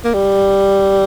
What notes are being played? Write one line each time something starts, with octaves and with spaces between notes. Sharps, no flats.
A#3
G3